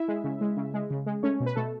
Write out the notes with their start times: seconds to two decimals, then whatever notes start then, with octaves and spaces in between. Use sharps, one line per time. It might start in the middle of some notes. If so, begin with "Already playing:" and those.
Already playing: E4 E5
0.08 G#3
0.24 C#3
0.41 G#3
0.57 C#3
0.74 G#3
0.90 C#3
1.06 G#3
1.23 A3 C#4 C#5
1.40 B2
1.46 B4
1.56 B2 A3 A4